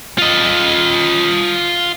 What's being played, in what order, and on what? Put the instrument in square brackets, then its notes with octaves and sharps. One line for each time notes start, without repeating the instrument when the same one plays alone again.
[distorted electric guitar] F4 D#5